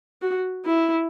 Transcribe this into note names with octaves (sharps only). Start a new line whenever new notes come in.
F#4
E4